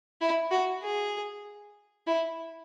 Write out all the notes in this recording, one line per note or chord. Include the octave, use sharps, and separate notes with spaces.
E4
F#4
G#4
E4